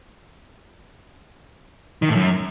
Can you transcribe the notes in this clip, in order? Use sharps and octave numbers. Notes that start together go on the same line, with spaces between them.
D#3
A2
F#2